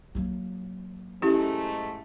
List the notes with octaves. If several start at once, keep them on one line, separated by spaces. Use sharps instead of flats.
F#3 A#3
G#2 A3 C#4 E4 G4